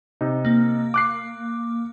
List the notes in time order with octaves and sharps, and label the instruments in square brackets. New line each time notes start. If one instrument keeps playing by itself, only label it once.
[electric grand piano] C3 D#4
[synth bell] A#3
[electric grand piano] D6 F#6 C7